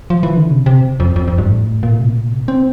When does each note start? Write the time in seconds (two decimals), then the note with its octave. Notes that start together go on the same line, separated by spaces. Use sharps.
0.10 F3
0.23 E3
0.36 D3
0.50 C3
0.66 C3
1.00 F2
1.16 F2
1.28 F2
1.38 G2
1.49 A2
1.83 A#2
1.90 A2
1.99 C3
2.07 A#2
2.15 A2
2.24 A#2
2.32 C3
2.48 C4